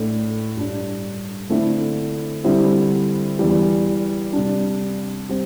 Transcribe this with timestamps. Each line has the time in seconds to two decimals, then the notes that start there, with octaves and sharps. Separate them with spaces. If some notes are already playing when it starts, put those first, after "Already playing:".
Already playing: A2 A3 D4
0.56 G2 G3 D4
1.49 D3 A3 C4 E4
2.44 D3 G3 C4 E4
3.39 E2 E3 G3
4.33 C3 G3 D4
5.29 G3 C4